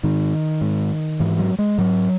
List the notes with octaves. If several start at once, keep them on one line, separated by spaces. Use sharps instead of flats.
G#2 D#3
G#2
G#2 E3
F#3
G#3
G#2 F#3